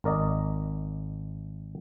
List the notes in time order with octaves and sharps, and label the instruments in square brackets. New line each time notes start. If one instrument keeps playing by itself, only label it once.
[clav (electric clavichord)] G#1 A#4 D5 D#5